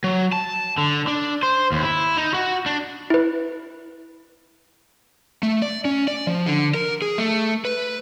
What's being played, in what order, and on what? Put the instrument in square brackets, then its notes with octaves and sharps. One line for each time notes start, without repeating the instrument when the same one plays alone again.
[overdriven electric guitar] F#3
A5
D3
D4
C5
D#2
E4
D#4
F#4
D4
[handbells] E4 B4
[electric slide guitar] A3
D5
C#4
D5
F3
D3
A#4
G#4
A3
B4